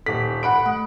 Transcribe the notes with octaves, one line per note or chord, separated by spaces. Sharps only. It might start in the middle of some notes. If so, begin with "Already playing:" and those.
D#1 A4 B6
F#5 B5 D7
A3